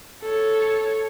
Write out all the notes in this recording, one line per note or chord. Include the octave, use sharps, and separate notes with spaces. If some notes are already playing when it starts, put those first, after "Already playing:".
A4 C#5